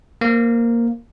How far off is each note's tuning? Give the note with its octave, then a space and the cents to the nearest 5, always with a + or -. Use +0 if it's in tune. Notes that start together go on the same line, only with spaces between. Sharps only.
A#3 +0 C5 +0